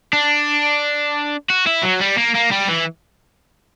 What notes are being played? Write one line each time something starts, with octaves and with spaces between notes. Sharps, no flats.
D4
F#4
E4
F#3
G3
A#3
A#3
G3
E3